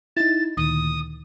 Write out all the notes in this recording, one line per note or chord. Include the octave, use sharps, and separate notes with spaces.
D#4 E4 A6
D2 A#2 D#3 D#6